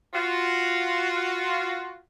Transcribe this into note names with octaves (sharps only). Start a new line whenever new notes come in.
F4 F#4